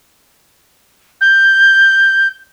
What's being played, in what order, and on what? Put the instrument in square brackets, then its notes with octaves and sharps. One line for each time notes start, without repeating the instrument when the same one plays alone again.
[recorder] G6